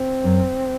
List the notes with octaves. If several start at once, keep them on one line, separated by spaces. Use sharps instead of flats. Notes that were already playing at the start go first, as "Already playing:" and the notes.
Already playing: C4
F#2